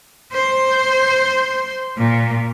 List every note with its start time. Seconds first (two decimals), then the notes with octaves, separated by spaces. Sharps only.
0.32 C5
1.97 A#2